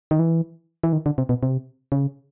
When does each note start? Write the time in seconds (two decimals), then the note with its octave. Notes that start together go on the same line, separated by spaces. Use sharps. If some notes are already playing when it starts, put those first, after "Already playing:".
0.11 D#3
0.19 E3
0.84 E3
0.93 D#3
1.06 D3
1.18 C3
1.29 B2
1.43 C3
1.92 C#3